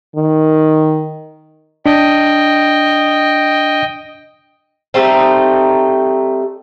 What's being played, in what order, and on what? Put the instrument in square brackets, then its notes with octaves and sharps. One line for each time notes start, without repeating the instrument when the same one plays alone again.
[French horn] D#3
[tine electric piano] D4 [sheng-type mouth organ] D#5 G5
[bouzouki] G3 A3 C4 D#4